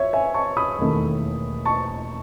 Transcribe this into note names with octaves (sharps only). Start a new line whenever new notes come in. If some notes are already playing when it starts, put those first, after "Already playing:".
Already playing: C#5 E5
E5 G#5
A5 C#6
B5 D#6
E1 D#2 D#3 A3 E4
A5 C#6